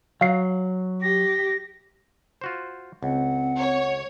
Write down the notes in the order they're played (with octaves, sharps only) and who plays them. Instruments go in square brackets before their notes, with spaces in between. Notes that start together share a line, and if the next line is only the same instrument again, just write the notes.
[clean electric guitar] F#3 [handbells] F5 C7
[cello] G4 [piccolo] A#6
[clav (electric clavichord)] F4 F#4 C5
[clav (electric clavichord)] C#2 [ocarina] C4 [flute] F#5
[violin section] C#5